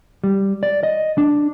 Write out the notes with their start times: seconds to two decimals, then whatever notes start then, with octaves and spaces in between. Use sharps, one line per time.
0.24 G3
0.63 D5
0.83 D#5
1.18 D4